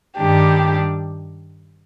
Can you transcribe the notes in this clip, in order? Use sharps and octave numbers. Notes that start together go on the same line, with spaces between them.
G2 D#3 G3 D4 G4